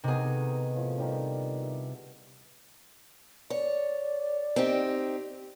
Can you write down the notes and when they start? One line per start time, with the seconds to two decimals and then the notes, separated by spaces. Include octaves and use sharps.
0.04 C3 D#3 B3 G#4
0.23 A4
0.76 A2 F3
0.98 D#3 G3 D4
1.63 E5
3.50 C#5 D5
4.56 C4 D#4 G4